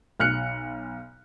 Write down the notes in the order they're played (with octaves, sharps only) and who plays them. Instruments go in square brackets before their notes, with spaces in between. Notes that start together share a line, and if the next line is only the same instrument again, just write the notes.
[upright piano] B1 F6 F#6 C#7